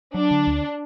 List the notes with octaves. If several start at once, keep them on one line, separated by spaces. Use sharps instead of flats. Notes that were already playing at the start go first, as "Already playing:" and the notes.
F#3 D4
D3
D2